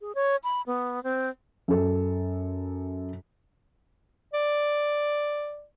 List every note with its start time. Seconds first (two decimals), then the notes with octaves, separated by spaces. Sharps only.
0.01 G#4
0.15 C#5
0.44 B5
0.67 B3
1.03 C4
1.68 F#2 A4
4.33 D5